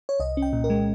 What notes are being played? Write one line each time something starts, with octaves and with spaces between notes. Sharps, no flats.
C#5
C2 D#5
C#4
G5
A#2
A#4
G#3